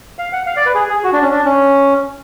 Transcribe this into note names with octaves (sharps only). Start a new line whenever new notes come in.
F5
F#5
F5
D5
B4
G#4
G#4
F#4
D4
C#4
D4
C#4